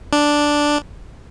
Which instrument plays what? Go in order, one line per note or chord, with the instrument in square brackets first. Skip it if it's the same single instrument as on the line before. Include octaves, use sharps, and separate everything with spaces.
[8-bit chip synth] D4